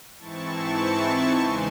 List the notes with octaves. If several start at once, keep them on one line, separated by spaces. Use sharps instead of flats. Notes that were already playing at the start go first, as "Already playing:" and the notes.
G#2 E3 C4 E4 A5 C#6
E2 C#3 E3 G#3 D#4 G#5 C6